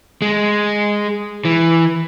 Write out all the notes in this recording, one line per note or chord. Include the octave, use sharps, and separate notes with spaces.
G#3
E3